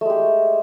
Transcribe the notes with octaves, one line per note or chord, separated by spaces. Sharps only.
G#3 A3 G4